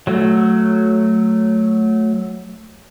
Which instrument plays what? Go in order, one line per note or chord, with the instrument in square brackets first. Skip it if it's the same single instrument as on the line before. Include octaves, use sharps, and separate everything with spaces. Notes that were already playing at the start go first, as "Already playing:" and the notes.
[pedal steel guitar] F#3 A3